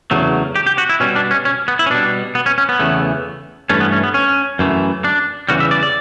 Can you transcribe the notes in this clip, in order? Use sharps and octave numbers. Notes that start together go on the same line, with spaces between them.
E2 C#3 F#3 A3
G4
G4
F#4
E4
B2 G3 C#4
D4
C#4
C#4
B3
E4
C#4
B2 G3 D4
B3
C#4
C#4
B3
E2 C#3 E3 A3
G2 E3 A3 C#4
B3
C#4
B3
C#4
F#2 E3 A3
D4
E2 C#3 E3 G3 F#4
E5
D5
D5